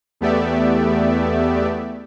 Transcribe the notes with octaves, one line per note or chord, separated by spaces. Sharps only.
E2 A3 B3 G4 D5 E5